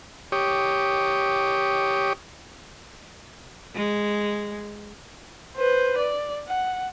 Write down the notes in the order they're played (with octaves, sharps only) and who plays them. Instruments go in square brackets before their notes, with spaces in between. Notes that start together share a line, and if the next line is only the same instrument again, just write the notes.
[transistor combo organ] G4 C#5 D6 D#6
[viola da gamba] G#3
[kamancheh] B4 C5
D5
F#5